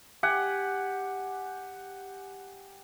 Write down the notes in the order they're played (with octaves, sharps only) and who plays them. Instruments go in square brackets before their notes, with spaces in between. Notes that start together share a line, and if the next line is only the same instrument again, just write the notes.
[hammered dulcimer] G4 F#5 G#5